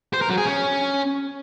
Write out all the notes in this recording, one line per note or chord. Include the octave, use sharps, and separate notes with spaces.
C5
A#4
F#3
G#4
C#4